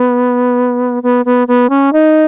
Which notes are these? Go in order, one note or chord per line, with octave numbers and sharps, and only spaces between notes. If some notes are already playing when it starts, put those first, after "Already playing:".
Already playing: B3
B3
B3
B3
C#4
D#4